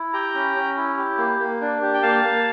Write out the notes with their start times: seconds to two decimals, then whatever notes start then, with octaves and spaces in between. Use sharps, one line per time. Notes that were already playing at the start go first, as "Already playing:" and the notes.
Already playing: E4
0.13 G4 G5 A#5
0.34 C#4
0.56 C#4
0.77 E4
0.98 G4
1.18 A#3
1.39 A#3
1.61 D4
1.82 G4
1.94 G5
2.03 A#3 F5 A5
2.24 A#3